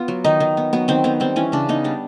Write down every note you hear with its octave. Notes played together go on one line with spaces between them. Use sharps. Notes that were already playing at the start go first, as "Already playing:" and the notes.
Already playing: B3 F4
F#3
D#3 D#4
D#3
B3
F#3 B3
D#3 C4
D#3 B3
G3 C4
E3 C#4
C#3 D4
B3 D#4
G3 D4